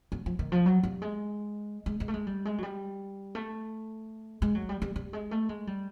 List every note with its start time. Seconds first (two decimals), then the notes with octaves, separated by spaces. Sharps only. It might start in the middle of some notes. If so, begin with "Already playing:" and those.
0.12 F#3
0.26 F3
0.39 D#3
0.52 F3
0.66 F#3
0.83 G3
1.02 G#3
1.86 G#3
2.00 G#3
2.08 A3
2.14 G#3
2.27 G3
2.45 G#3
2.58 F#3
2.63 G3
3.35 A3
4.42 G#3
4.55 F#3
4.69 G3
4.82 G3
4.96 G3
5.13 G#3
5.31 A3
5.49 G#3
5.67 G3